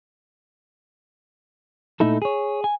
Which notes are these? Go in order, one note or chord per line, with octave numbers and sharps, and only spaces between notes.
A#2 A3 D#4 E4 A4
G#4 C#5
G#5